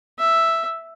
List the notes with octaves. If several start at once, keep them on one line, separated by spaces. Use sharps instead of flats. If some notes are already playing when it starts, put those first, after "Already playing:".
E5